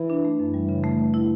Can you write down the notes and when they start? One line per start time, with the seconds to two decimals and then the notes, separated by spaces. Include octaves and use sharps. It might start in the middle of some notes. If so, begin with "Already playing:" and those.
Already playing: E3
0.10 D4
0.25 A3
0.39 F#2 E3
0.54 G3
0.69 C#3
0.84 A3
1.00 B4
1.14 E4